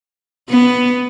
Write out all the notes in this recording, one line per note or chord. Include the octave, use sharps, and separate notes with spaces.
B3